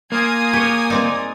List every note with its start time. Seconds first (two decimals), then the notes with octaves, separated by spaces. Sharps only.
0.12 A#3 F4 G#5 D#6 G#6
0.53 G4 G#4 C#5
0.90 G#3 C4 D#4 D5